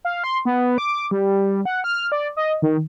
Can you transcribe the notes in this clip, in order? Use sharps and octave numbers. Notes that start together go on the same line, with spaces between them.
F5
C6
B3
D6
G3
F#5
F6
D5
D#5
D#3